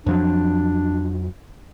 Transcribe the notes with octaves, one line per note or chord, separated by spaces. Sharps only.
F2 F3 F#3 D4